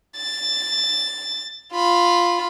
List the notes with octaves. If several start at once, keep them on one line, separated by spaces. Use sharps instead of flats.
A6
F4 B5